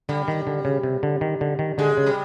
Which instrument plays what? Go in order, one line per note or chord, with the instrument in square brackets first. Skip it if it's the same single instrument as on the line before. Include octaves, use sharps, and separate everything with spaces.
[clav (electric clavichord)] D3 [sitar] G3
[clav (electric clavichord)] D#3
D3
C#3
C3
D3
D#3
D3
D#3
[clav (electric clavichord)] D3 [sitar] G#3
[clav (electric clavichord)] C#3
[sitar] G3